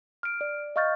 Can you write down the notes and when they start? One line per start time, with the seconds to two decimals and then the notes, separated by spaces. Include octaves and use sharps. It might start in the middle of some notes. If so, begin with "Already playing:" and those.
0.23 F6 D7
0.41 D5
0.76 D#5 F5 C#6 F6 G6 A6